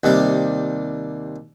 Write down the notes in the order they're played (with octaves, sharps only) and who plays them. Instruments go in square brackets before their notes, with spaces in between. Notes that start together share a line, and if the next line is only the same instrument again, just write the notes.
[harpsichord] D#2 C3 G3